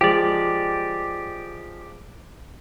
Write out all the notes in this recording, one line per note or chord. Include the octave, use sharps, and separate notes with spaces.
F3 G#3 G4 D5